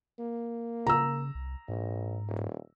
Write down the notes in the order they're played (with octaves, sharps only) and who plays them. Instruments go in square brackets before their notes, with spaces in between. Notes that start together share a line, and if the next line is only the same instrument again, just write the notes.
[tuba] A#3
[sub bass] C#3 [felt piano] A#5 E6
[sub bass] C2
[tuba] A#1 [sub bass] G#2
[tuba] D#1